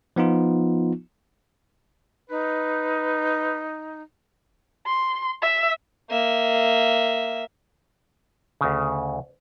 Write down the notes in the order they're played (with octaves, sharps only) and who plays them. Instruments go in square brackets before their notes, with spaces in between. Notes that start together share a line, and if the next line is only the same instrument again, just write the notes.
[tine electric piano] F3 B3 D#4 F4
[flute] D#4 [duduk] B4
[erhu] C6
E5
[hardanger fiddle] A#3 E5
[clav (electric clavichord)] D2 C#3